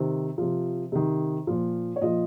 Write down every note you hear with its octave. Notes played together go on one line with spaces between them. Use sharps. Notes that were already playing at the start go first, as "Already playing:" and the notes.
Already playing: C3 D#3 C5
C3 F3
C3 D#3
A#2 F3
C#5
A#2 F3 D#5